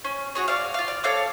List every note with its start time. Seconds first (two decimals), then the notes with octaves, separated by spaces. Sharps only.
0.05 C#4
0.35 F#4 G#4 C#5
0.48 D5 F5
0.74 F4 F5
0.88 D5
1.04 A4 C#5 F5 D6